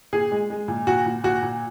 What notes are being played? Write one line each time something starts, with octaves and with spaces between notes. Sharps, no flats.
A#2 G#4
G#3
G#3
A#2
A#2 F#4
A#2
A#2 F#4
A#2